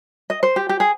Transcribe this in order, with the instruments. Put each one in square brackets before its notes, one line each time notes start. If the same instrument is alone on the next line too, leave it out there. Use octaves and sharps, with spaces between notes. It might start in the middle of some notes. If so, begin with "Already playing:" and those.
[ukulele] D#5
C5
G4
G4
G#4